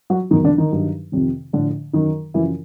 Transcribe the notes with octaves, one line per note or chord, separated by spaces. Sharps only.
F#3 F#4
E2 B2 D#3 F#3 D#4
D3 D4
D#3 D#4
G2 D#3 F#3
F2 C3 D#3
A2 D3 F3 D4
F#2 D#3 F#3 D#4
F#2 C#3 E3 F3 E4